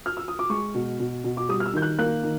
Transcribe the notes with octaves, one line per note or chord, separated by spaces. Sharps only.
F6
E6
D#6
D6
G#3 C#6
B2
B2
B2
D6
G3 D#6
F6
E6
D#3 G6
F#6
A#3 F#6
D#3